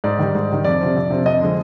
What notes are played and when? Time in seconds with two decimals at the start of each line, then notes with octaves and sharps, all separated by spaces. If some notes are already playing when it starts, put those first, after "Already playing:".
0.04 G#2 D5
0.19 D#3 G3
0.35 G#2
0.49 D#3 G3
0.64 F2 D5
0.80 C3 F3
0.96 F2
1.10 C3 F3
1.26 F2 D#5
1.41 D3 F3 G#3